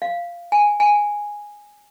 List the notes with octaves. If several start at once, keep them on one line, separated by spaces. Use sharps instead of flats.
F5
G#5
G#5